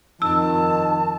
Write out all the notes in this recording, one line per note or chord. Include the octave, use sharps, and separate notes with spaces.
F2 D#3 A5 E6